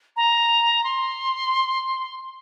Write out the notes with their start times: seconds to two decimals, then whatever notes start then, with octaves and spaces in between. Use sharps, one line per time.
0.16 A#5
0.84 C6